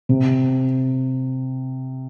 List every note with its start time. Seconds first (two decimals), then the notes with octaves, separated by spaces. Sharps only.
0.09 C3